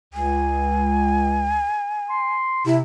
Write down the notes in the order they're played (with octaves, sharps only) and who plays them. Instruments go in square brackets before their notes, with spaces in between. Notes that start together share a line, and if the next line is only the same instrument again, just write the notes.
[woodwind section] C#2 [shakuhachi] G#5
[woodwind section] C6
[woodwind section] C3 [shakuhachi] E4